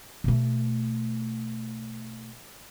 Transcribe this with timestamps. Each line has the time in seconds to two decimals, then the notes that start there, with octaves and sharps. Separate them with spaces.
0.24 B2 A3